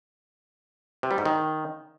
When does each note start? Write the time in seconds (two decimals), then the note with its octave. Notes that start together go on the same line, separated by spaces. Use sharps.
1.03 C3
1.11 G3
1.18 G#2
1.26 D#3